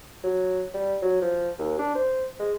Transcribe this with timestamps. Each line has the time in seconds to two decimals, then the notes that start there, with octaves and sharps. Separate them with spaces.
0.24 F#3
0.74 G3
1.02 F#3
1.22 F3
1.59 D#2
1.79 D4
1.95 C5
2.40 G#3